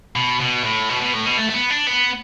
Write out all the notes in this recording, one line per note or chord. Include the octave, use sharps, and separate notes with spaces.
B2
B2
A2
B2
B2
A2
B2
A3
A3
B3
D4
B3